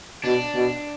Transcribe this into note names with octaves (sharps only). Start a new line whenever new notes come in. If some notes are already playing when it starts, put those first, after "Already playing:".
B2 D4
B2